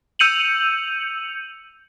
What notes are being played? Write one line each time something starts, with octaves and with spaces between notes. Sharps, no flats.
E6 G6 C#7 D#7 F7 F#7